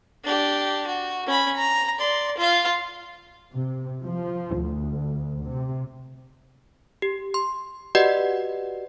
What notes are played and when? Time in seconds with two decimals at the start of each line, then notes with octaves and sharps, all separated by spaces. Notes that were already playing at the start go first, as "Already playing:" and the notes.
0.24 D4 G4
0.87 F#4
1.27 C#4 B5
1.56 A#5
1.99 D5 C6
2.38 F4 F5
3.52 C3
4.03 F3
4.56 D2
5.44 C3
7.02 G4
7.34 C6
7.95 F#4 G4 B4 D5 D#5 F#5